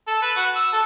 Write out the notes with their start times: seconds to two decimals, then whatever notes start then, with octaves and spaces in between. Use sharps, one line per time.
0.08 A4
0.22 B4
0.37 F#4
0.56 E6
0.73 A4